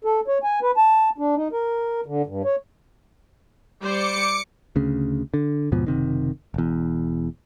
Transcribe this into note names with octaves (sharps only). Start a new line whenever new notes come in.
A4
C#5
G#5
B4
A5
D4
D#4
A#4
D3
G2
C#5
G3 C5 D5 D6 C#7
D2 C#3
D3
D#2 G#2 B2 F3
F#1 C3 D#3
E1 E2